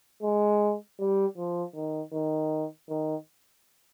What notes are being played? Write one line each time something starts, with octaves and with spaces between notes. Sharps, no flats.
G#3
G3
F3
D#3
D#3
D#3